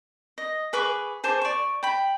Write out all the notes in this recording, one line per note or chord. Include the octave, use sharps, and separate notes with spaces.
D#5
G#4 B4 C#6 D6
G#4 C5 A5 D6
D5 C#6
G5 B5